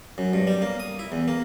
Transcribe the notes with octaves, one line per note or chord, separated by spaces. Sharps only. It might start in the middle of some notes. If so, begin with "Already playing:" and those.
F#2
G2
G3
A#3
D#6
E4
E2
A#3